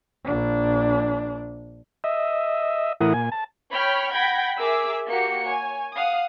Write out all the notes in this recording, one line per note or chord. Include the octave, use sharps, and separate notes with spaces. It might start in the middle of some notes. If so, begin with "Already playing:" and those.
A#1 D4
D#5 E5
A2 E3 E4 A#4 F#5 D#6
A#2 G#5
A5
C#5 G5 B5 C#6 F6
F#5 G5 B5 G#6 A#6 B6
G#4 A#4 E5 D6 E6
A#3 F#4 G4 C#7
C#5 G#5
F5 F#5 D#6